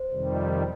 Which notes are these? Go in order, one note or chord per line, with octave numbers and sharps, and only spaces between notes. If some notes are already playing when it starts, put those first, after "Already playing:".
Already playing: C5
F2 C3 D#3 G3